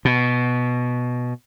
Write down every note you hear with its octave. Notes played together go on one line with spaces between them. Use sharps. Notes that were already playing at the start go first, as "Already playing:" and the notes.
B2